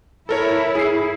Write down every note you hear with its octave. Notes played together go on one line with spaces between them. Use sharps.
E4 A4 A#4 C#5
G#4 C7